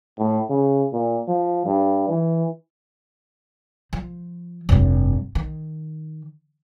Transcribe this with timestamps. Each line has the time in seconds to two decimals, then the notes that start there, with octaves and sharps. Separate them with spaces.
0.19 A2
0.50 C#3
0.93 A#2
1.28 F3
1.66 G2
2.09 E3
3.93 F3
4.69 F1 G2
5.35 D#3